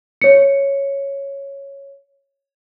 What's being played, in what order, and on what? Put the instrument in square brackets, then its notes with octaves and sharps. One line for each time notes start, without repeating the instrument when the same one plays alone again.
[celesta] C#5 C#7